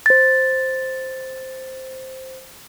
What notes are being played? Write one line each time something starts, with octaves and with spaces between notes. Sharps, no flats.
C5 A6